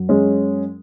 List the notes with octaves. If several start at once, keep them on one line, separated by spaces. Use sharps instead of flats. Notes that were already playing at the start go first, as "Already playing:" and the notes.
Already playing: F#2 F#3
G#3 C#4